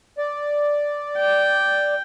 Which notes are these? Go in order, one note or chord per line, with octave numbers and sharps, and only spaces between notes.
D5
G5